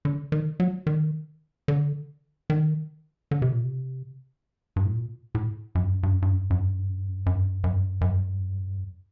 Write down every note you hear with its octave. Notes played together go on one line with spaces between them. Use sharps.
D3
D#3
F#3
D#3
D3
D#3
D3
C3
A#2
C3
G2
A2
A#2
A2
F#2
G2
F#2
G2
F#2
G2
F#2
G2
F#2
G2
F#2
G2
F#2
G2
F#2
G2
F#2
G2
F#2
G2
F#2
G2
F#2
G2
F#2
G2
F#2
G2
F#2
G2
F#2
G2
F#2